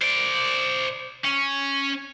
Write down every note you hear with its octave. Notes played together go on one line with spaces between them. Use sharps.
C5 D5
C#4